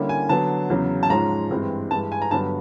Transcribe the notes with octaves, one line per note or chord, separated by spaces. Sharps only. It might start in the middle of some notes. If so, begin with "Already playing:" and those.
Already playing: D3 G3 A#3 C#4 E4
G#5
D3 F#3 B3 A5
E2 C#3 F#3
A5
G#2 F3 G#3 C#4 A#5
G2 E3 G#3 C4
G2 E3 G#3 A5
G#5
A#5
G2 D3 F#3 B3 A5